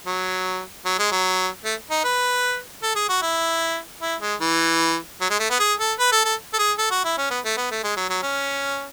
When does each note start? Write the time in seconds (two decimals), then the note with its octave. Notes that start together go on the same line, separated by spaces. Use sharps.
0.06 F#3
0.85 F#3
0.99 G#3
1.11 F#3
1.65 A3
1.91 D#4
2.04 B4
2.83 A4
2.96 G#4
3.09 F#4
3.22 E4
4.01 E4
4.21 G#3
4.41 E3
5.21 F#3
5.30 G#3
5.40 A3
5.50 B3
5.60 G#4
5.79 A4
5.99 B4
6.12 A4
6.25 A4
6.54 A4
6.59 G#4
6.78 A4
6.91 F#4
7.05 E4
7.18 C#4
7.31 B3
7.45 A3
7.57 B3
7.71 A3
7.84 G#3
7.97 F#3
8.10 F#3
8.23 C#4